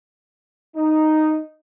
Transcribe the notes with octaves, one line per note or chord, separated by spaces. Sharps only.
D#4